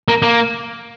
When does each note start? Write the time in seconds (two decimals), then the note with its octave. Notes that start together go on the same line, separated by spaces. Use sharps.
0.08 A#3
0.22 A#3